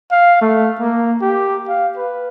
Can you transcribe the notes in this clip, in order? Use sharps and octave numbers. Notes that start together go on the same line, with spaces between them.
F5
A3
A#3
G4
F5
B4